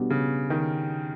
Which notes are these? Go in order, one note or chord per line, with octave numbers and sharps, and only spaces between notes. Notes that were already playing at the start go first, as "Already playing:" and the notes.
Already playing: B2 G3 B3 D4 F#4
C#3
D#3